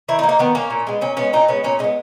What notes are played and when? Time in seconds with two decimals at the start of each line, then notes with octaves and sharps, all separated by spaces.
0.08 D#3 E4
0.19 D#4
0.23 A#3
0.29 D#4
0.39 D#3 B3
0.55 A#3 C#4
0.70 A#2
0.87 G#3 B3
1.01 A#2 C#4
1.17 G#3 B3 C#4
1.33 A#2 D#4
1.48 G#3 B3 C#4
1.64 A#2 C#4
1.79 G#3 D#4
1.84 B3